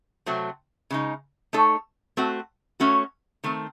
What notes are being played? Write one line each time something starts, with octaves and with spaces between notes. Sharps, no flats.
C3 F#3 A3 C4
C#3 G#3 D#4
A3 D#4 A4 C#5
A3 C4 F#4
A3 C#4 F#4 C#5
D#3 A3 C4